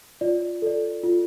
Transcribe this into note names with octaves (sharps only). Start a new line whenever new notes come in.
F4 D5
A4 D5
F4